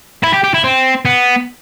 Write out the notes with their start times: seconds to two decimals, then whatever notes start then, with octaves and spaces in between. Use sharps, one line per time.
0.23 E4
0.33 G4
0.44 G4
0.54 E4
0.64 C4
1.05 B3